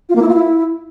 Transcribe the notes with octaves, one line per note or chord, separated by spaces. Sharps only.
F4
A#3
E4
F4
E4